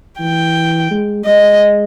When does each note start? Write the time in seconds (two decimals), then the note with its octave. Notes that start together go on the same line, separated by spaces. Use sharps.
0.20 E3 G5
0.91 G#3
1.25 G#3 D#5